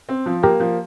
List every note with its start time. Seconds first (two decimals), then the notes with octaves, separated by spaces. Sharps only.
0.09 C4
0.26 F3
0.43 A#3 G4 A#4
0.60 F3